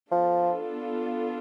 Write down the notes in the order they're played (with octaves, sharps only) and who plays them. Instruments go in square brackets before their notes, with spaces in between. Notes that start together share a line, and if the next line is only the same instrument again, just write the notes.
[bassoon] F3 [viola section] B3 D4 F4 A4